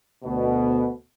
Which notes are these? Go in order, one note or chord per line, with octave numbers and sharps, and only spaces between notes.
D2 B2